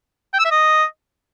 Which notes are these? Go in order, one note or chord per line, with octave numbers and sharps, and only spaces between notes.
G5
E6
E5
D#5